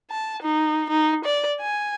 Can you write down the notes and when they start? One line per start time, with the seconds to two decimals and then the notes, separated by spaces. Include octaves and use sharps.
0.10 A5
0.43 D#4
0.90 D#4
1.25 D5
1.60 G#5